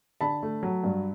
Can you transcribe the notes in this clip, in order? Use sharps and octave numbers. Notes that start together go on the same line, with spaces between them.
D3 A5 B5
A3
F#3
G2